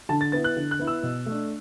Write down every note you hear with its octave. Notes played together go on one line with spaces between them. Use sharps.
D3 A5
A6
B3 E4 A6
F#6
D3
F#6
B3 E4
E6
B2
A3 D4